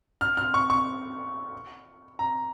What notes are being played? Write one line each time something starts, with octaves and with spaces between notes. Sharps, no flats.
F6
F6
C#6
C#6
A#5